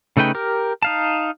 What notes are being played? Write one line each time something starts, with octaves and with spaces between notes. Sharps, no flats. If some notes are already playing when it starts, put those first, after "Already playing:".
C#3 A3 D#4 B4 G5
G4 A#4
D#4 F5 A5